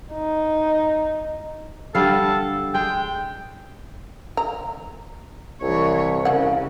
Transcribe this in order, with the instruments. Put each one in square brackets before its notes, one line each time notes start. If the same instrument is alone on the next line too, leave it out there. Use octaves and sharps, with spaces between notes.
[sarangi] D#4
[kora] D3 G3 F5 [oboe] A4
[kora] G#3 [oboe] G5
[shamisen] A#5
[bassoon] C2 [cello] E3 C#5
[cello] C#3 [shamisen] A#3 F#5